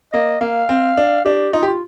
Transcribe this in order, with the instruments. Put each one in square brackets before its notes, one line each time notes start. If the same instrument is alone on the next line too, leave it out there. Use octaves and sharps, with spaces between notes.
[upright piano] A#3 [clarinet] D#5
[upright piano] A#3 [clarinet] F5
[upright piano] C4
D4
[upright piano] D4 [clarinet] G4
[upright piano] D#4 [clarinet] F4
[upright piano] G4
[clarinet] F4